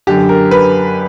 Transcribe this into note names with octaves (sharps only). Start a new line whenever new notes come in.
F#2 D3 G4
A#4
B4